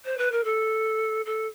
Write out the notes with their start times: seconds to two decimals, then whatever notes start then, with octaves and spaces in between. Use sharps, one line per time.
0.05 C5
0.17 B4
0.31 A#4
0.44 A4
1.25 A4